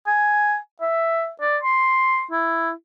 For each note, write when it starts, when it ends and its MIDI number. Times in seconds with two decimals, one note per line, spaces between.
0.07 0.57 80
0.81 1.29 76
1.41 1.58 74
1.63 2.24 84
2.31 2.71 64